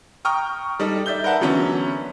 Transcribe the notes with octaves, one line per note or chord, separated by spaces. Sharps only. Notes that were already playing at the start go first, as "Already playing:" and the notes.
G5 A#5 C#6 D#6 F6
G3 D#4 A4
D5 E5 G6 G7
A#4 B4 F#5 A5
D3 E3 F#3 B3 C#4